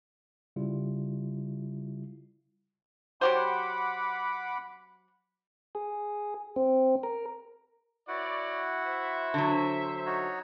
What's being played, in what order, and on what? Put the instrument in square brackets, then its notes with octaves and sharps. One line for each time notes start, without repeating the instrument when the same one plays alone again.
[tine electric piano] C#3 G3 E4 F4
[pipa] F#3 G4 C5 [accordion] F#5 B5 D6
[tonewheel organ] G#4
C4
A#4
[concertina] E4 F#4 F#5 [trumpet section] B4 C#5 D5
[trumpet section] C5 E5
[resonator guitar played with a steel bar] D3 F#3
[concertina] D#4 F#4 C#5